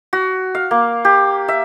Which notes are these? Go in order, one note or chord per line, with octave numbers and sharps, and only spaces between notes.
F#4
F5
A#3
G4
E5